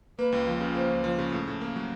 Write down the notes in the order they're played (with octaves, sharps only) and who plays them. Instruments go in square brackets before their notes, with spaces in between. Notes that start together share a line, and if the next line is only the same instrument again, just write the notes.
[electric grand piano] A#3 [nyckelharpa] B4
[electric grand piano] C#2
F3
C#3
[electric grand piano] A#3 [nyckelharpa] C5
[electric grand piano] C#2
F3
C#3
A2
A2
A#3
F#3